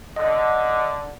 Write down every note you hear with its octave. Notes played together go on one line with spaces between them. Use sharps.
D3 D#5